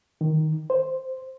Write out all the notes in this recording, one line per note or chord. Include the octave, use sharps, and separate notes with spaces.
D#3
C5